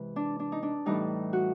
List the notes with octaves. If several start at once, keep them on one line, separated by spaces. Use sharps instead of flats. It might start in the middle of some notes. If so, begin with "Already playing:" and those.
Already playing: C3 E3 G#3 B4
D4
D4
D#4
D4
A2 E3 G3 D#4
F#4